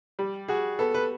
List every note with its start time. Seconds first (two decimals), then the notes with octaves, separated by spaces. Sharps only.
0.19 G3 G4
0.48 F#4 G#4
0.79 B3 A4
0.94 B4